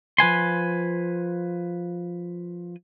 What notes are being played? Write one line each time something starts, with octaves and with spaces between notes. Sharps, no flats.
F3 B4 G#5 C6